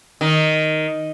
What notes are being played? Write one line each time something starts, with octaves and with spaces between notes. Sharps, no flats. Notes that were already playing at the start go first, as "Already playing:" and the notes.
D#3